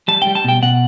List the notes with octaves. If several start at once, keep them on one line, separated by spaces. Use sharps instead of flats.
G3 A5
G5
G3
A5
B2 G5
B2 F#5